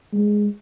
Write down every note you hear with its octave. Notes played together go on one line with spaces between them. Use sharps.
G#3